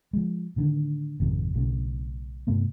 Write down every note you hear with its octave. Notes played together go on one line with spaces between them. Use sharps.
F3 G#3
A2 D3 D#3
G#1 F2 C3 D#3
B1 A2 C#3
G2 C3 A3 B3